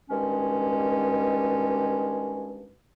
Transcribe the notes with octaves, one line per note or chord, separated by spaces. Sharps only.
G2 B2 D#3 G#3 C#4